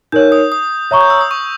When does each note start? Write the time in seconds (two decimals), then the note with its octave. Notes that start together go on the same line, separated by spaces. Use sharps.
0.12 D#4 A#4 C#5 G6
0.32 D#6
0.52 D#6
0.91 C#5 E5 A#5 C#6
1.01 G6
1.10 E6
1.21 D#6
1.31 C#6